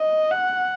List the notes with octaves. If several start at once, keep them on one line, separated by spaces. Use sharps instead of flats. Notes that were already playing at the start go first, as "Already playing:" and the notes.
Already playing: D#5
F#5